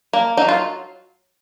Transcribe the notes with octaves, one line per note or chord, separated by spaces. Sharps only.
A#3
F#3 D#4
F4